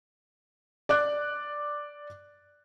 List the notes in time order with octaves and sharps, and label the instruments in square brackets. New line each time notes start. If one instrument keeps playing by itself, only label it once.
[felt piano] D5 D6 F#6